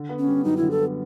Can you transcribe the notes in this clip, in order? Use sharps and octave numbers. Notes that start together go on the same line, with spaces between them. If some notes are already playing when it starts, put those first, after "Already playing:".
Already playing: D3
B3
C#4
G3
F#2 D#4
E4
D3
A4
B3